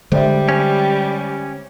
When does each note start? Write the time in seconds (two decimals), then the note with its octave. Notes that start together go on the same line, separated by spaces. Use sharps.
0.12 D3 G3 G#3 C5 D5 E5
0.49 C#4